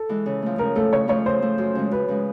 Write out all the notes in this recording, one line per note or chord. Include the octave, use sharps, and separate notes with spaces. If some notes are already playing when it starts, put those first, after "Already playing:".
Already playing: A4
E3 G#3
C#3
F3 A3
C#3 A#4
F3 A3 A4
C#3 C#5
F3 A3 C#5
C#3 C5
F3 A3
F#2
C#3 F3 G#3
F#2 B4
C#3 F3 G#3